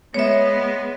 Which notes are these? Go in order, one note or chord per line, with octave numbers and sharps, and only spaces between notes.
G#3 B3 C#5 E5